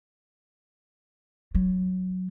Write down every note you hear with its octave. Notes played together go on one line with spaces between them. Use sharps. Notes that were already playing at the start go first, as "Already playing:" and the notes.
F#3